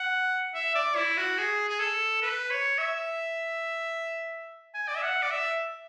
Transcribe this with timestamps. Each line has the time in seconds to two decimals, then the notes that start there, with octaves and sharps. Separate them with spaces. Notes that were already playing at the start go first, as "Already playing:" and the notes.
Already playing: F#5
0.54 E5
0.75 D5
0.95 E4
1.17 F#4
1.38 G#4
1.68 G#4
1.79 A4
2.22 B4
2.50 C#5
2.78 E5
4.74 G#5
4.88 D5
4.95 E5
5.02 F#5
5.22 D5
5.31 E5